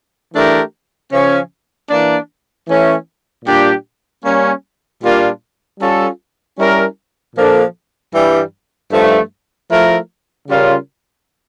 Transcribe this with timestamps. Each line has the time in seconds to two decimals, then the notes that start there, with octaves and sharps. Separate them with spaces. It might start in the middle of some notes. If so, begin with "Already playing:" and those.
0.33 E3 A3 D4 G4 A#4
1.11 C#3 F3 C#4
1.89 E3 A#3 D4
2.68 E3 A3 C#4
3.45 A#2 G3 D4 G4
4.23 G3 A#3 C#4
5.01 A#2 G3 A#3 D4 F4
5.80 G3 C#4 F4 A4
6.57 G3 C#4 E4 A#4
7.35 A#2 F3 A#3 D4 A4
8.13 G2 E3 G3
8.91 G2 F3 A3
9.70 F3 A3 E4 A#4
10.48 C#3 G3 C#4 F4 A#4